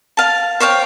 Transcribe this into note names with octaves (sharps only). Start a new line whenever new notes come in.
F5 A5
C5 C#5 F5 G5